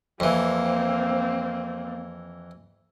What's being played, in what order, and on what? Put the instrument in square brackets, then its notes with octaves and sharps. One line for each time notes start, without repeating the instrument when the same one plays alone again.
[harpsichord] F2 E3 [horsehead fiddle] A#3 C4